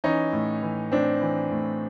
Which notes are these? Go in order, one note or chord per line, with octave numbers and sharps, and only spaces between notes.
E3 C#4 D#4
A2
E3
A2 C4 D4
E3
A2